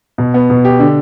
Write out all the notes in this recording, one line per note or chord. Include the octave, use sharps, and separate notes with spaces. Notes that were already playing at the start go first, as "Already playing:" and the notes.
B2
B3
B2
G4
D3